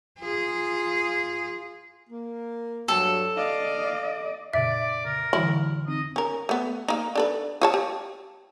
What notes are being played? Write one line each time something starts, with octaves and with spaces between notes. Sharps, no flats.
F4 G#4
A#3
G2 F#3 A4
D5 D#5 F5
F2 A#2 C#3 D5 E5
C#3 A#4
D3 E3 G3 E4
C4 D#4 D#5
C#4 A#4
A3 B3
A#3 D#4
D4 A4 B4
F4 C#5 A5
G4